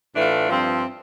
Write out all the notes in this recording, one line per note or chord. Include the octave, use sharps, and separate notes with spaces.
A2 E3 A3 D4 F4
G2 F3 C4